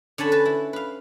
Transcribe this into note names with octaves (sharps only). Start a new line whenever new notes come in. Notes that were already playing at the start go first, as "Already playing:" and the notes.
D3 C#4 G#5 A5 B5
B4 A5
E4
B4 F5